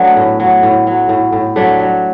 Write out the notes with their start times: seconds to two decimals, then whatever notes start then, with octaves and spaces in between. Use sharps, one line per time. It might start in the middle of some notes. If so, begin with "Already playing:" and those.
Already playing: F#3 A3 B3 D4
0.16 A2
0.40 F#3
0.63 A2
0.87 F#3
1.09 A2
1.32 A2
1.56 F#3 A3 D4
1.79 F#3